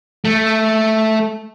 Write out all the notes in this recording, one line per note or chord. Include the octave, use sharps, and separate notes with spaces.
A3